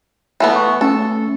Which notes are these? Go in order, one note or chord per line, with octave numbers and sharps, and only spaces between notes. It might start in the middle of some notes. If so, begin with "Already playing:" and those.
E3 A3 B3
C#6
A3 C#4 A4